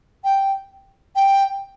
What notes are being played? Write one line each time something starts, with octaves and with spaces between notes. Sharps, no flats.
G5
G5